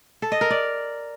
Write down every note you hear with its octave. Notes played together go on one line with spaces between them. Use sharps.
A4
D#5
A#4
D5